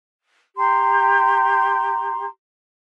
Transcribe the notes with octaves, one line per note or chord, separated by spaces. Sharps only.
G4 A#5 C6